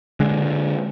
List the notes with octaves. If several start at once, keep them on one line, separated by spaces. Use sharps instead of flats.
D3 G#3